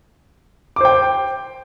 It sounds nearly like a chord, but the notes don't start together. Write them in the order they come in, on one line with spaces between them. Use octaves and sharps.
D6 C5 G5